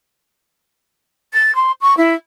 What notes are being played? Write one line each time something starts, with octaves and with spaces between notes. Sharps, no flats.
A6
C6
C#6
E4